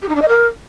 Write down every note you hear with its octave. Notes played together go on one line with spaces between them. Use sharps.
G4
D#4
D4
D#5
A#4